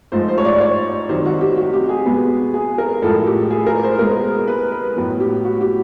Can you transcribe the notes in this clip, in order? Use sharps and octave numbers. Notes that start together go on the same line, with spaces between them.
G#2 F3 A3 C5
C5
C#5
D5
C#5
C3 D#3 F#3 C5
F#4
G4
F#4
G4
G#4
B2 G#3 B3
G#4
A#4
A2 F3 G#3 A4
G4
G#4
A#4
C5
B2 G#3 B3 A#4
B4
B4
A2 F#3 B3
G4
F#4
G4